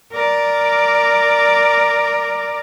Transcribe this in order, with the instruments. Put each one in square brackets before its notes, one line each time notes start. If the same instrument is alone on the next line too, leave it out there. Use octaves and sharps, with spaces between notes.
[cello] A#4 D5